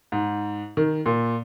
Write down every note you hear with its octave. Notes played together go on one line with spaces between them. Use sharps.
G#2
D#3
A#2